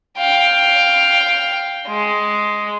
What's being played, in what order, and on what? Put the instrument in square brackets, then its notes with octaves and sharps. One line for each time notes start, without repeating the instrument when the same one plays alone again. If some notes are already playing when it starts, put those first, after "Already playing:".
[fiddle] F5 G5
G#3